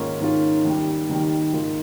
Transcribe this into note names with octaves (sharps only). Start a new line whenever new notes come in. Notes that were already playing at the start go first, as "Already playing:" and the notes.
Already playing: G#2 D#3 A#3 C#4 F4
G#2 D#3 A#3 C#4 F4
D#2 D#3 G3
D#2 D#3 G3
G#2 D#3 A#3 F4